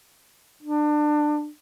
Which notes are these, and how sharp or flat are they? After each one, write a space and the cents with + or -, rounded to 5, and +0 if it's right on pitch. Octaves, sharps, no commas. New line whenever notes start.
D4 +25